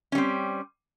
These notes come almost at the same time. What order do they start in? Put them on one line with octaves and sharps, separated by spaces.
C#4 G3 C4